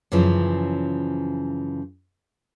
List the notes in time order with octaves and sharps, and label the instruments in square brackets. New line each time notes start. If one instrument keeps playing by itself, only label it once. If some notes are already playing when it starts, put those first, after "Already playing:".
[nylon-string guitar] F#2 C#3 E3 F3